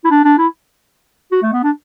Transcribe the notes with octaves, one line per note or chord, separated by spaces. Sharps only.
E4
D4
D4
E4
F#4
A3
B3
D4